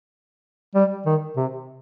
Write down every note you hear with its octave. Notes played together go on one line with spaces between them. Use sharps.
G3
D#3
C3